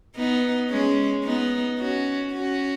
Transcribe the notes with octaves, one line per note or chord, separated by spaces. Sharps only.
B3 D#4
G#3 C#4
B3 D#4
C#4 F#4
C#4 F#4